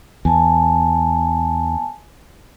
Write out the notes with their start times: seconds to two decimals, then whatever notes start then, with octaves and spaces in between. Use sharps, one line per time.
0.25 E2 G#5 A5